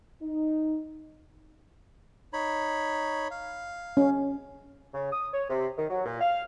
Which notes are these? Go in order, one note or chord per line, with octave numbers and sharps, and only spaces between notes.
D#4
D#4 C#5 B5
F5
C#4
C#3
D#6
C#5
C3
D#3
F#3
A#2
F5